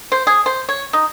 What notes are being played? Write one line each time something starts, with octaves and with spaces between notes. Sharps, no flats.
C5
G#4
C5
C#5
D#4